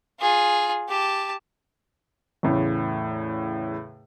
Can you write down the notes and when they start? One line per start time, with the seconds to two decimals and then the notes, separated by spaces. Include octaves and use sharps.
0.20 F4 G#4
0.89 G4 A5
2.43 E2 A2 C#3